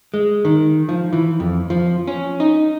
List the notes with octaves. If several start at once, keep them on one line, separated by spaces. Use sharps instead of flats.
G#3
D#3
F3
E3
F2
F3
C#4
D#4